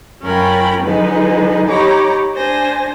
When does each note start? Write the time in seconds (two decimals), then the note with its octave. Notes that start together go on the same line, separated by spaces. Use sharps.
0.22 F#2 C#4 F4 A#4 G5 B5
0.83 D3 F3 F#3 G#3 D#4 B4
1.66 D#4 G4 C#5 A#5 B5 D6
2.34 D4 C5 G#5 A#6